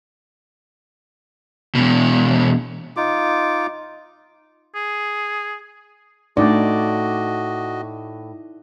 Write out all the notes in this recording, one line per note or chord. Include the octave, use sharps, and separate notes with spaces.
E2 B2
D#4 F4 D6
G#4
A2 A3 D4 D#4 F#4 D5 D#5